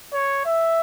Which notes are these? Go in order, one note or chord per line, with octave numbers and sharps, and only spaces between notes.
C#5
E5